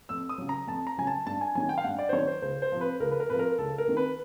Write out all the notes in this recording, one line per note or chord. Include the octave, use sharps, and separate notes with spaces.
F2 E6
D#6
C#3 F#3
A#5
F2 A5
A#5
C#3 F#3 G#5
A5
G2 A5
G#5
D#3 F#3 G#5
G5
F5
G2 F#5
D5
C5
D#3 F#3 C#5
C5
C#2 C5
C5
C3 F3
B4
C#2 A#4
B4
A#4
C3 F3 B4
A#4
C#2 A4
A#4
C3 D#3
B4